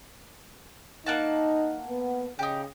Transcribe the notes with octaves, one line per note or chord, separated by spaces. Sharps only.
A#3 D#4 F#5 A5
B3
C#3 D#4 G4